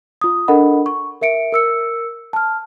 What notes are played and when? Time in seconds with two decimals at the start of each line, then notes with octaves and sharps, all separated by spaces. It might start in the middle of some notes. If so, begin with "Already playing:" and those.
0.21 F4 D#6
0.48 D4 A4 A#4 D#5 F#5 B5
0.86 C#6
1.21 A#4 E5 C#7 D7
1.52 A#4 E6 C#7
2.33 A5 F6